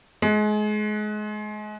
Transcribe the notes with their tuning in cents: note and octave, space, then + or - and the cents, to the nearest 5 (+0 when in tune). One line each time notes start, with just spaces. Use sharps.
G#3 +30